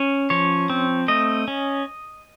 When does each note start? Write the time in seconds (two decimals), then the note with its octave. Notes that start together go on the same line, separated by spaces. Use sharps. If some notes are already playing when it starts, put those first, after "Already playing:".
Already playing: C#4
0.30 F3 C#5
0.70 C4
1.08 A3 D#5
1.48 C#4